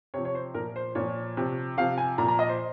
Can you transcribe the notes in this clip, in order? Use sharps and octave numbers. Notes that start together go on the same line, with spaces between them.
C3 F3 C#5
C#5
C5
A#2 F3 A#4
C5
A#2 F3 C#5
C3 F3
C3 F3 F5
G#5
A#2 F3 A#5
A#5
D#5
C5